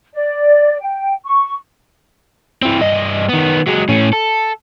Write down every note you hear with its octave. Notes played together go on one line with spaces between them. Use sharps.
D5
G5
C#6
E3 C4
G2 D#5
D#3 B3
F#3 G#3
A2 C#4
A4